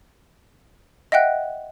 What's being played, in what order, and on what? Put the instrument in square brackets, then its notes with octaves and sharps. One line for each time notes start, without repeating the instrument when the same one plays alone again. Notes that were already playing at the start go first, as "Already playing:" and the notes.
[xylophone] D#5 E5 F#5 G5 F#6